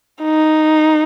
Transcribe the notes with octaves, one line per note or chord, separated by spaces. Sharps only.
D#4